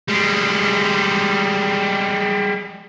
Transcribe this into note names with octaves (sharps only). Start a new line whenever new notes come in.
G3 G#3